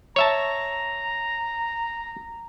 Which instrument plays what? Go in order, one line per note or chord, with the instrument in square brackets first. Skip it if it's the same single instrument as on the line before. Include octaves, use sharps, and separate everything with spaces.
[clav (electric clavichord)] C#5 E5 A5 [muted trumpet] A#5